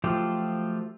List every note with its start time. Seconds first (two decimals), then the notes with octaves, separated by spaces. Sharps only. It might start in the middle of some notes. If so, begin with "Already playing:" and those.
0.04 F3 F#3 A3 F4 G4